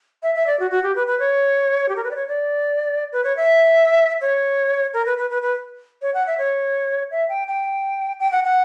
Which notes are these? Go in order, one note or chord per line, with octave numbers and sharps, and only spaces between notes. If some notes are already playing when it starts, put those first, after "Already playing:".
E5
E5
D5
F#4
F#4
G4
B4
B4
C#5
G4
A#4
B4
D5
C#5
D5
B4
C#5
E5
C#5
A#4
B4
B4
B4
B4
C#5
F#5
E5
C#5
E5
G5
G5
G5
F#5
F#5